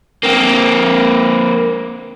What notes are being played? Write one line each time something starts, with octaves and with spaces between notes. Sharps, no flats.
A#3 C4